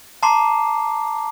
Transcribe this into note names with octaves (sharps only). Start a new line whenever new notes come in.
A5 A#5 C6 D6 C7